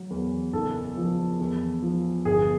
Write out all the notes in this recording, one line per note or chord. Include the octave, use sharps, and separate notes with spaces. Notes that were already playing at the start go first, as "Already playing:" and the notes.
Already playing: F#3
E2
F#1 A4
F3
E2
F3
G1 G#4